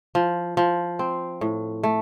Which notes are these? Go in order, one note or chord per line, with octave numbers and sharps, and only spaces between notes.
F3
F3
C4
A2
A3